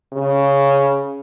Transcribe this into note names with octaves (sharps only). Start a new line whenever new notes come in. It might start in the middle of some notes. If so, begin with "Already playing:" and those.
C#3